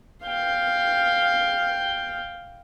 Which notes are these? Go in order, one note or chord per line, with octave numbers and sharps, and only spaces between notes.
F5 G5